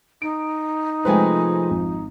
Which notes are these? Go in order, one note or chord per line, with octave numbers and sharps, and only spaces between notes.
D#4 D7
C3 F3 G#3 A3 B4 G5 G#5
G#1